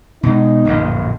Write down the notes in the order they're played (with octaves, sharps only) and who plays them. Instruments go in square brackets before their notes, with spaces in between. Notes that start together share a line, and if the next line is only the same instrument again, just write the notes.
[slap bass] B2 G#3 [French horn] D#4
[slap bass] D1 A#1 F#2